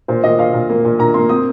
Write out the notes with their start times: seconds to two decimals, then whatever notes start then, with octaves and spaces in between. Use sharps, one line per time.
0.08 A#2 C5
0.24 A#2 D#5
0.39 A#2 F5
0.54 A#2
0.70 A#3
0.85 A#2
0.99 A#2 A#5
1.14 A#3 C6
1.29 C4 D#6